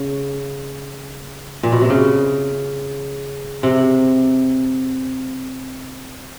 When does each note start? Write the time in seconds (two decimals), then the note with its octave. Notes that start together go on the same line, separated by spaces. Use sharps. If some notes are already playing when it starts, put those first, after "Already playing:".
Already playing: C#3
1.63 A#2
1.72 B2
1.81 C3
1.90 C#3
3.63 C3